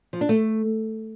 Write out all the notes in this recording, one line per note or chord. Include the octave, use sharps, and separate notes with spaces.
F3
D4
A3